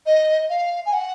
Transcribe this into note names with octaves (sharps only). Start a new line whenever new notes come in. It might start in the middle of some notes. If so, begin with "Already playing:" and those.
D#5
F5
G#5
F#5